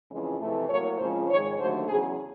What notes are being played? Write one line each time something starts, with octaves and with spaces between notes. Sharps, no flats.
F2 C#3 E3 G#3
F2 C3 E3 A3
A2 F#3 A#3 C#5
F2 C#3 F3 G#3 C5
G#2 D#3 G#3 C#5
D#2 D3 F#3 A3 C5
E2 C#3 F#3 G#4